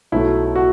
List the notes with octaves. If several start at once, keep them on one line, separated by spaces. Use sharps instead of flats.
B1 B2 F#3 A3 E4
F#4